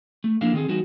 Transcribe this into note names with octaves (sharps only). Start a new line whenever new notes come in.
A3
F3 A#3 D4 E4 A4 F5
D#3 C4 F4 G#4 A4
E3 G3 B3 D#4 F#4